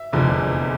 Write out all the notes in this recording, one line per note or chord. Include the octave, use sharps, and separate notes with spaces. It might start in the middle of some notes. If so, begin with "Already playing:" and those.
Already playing: E5
F1 E2 D3 F3